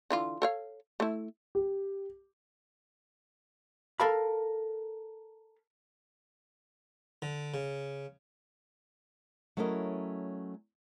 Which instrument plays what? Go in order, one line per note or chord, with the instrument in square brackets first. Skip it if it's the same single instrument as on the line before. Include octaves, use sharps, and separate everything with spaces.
[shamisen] D3 E3 F4
A4 C#5 F5
A3 E4
[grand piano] G4
[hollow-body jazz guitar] A4 A#4 F5 B5
[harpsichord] D3
C#3
[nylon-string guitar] F#3 A3 C#4 E4 A#4 D#5